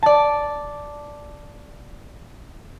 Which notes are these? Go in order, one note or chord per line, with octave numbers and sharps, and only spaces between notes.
D5 A5